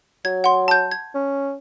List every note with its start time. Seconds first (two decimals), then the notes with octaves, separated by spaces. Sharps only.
0.25 F#3 G#6
0.44 F#5 C6
0.68 A5 G6
0.92 G#6
1.15 C#4